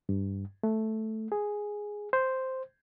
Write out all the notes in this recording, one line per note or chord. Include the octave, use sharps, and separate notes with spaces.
G2
A3
G#4
C5